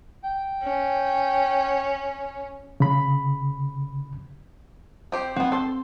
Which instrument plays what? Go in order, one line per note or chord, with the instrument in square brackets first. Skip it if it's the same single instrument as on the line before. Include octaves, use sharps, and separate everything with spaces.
[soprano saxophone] G5
[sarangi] C#4
[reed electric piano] C#3 B5
[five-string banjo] C4 G4 C5
[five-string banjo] B3 F#5 [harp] C4
[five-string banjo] A4 [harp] C5 C6